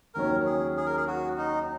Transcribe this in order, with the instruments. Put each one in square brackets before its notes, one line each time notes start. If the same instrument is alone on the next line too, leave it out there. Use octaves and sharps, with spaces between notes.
[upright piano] D#2 D#3 F#3 C#4 [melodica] A#4
[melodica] G#4
G#4
A#4
G#4
F#4
D#4